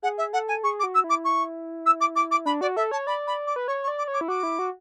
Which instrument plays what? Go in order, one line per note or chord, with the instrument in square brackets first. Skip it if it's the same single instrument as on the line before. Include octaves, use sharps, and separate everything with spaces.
[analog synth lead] G#4 [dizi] F#5
[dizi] E5
[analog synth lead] A4 [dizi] F#5
[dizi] G#5
[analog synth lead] G#4 [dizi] C#6
[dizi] D6
[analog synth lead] F#4
[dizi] E6
[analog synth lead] E4 [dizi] D6
[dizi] C#6
E6
D6
D6
D6
[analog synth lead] D4 [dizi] B5
[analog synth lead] F#4 [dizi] D5
[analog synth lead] A4 [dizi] E5
[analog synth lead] C#5 [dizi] A5
[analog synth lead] D5 [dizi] B5
[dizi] B5
D6
[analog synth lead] B4
[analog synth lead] C#5 [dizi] C#6
[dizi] C#6
[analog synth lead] D5
[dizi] D6
[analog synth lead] C#5
[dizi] D6
[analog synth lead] E4
[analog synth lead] F#4 [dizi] D6
[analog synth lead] E4
F#4